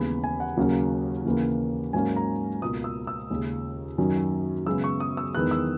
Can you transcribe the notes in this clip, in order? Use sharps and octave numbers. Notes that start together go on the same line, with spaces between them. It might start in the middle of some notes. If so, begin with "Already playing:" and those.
Already playing: D#2 C#3 E3 G#3 B3 B5
G#5
F#5
D#2 C#3 F#3 A#3 C#4
D#2 C#3 E3 A#3
G#2 F#3 A#3 C#4 G#5
A#5
C#2 B2 A#3 D#6
E6
E6
D#2 C#3 G#3 C#4
F#2 D#3 F#3 C#4
F#2 C#3 G#3 B3 E6
C#6
D#6
E6
E2 D#3 G#3 B3 F#6
E6